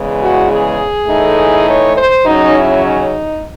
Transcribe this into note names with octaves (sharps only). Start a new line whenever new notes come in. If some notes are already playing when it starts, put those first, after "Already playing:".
Already playing: E2 C#3 E3 G#3
F#4
G#4
A2 E3 A3 D#4
C#5
C5
C#3 F#3 C#4 D#4
E4
D#4